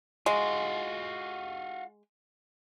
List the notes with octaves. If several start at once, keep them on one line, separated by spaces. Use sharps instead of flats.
G#3 F4 F#4